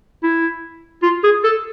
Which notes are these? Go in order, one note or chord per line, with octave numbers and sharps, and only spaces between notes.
E4
F4
G#4
A4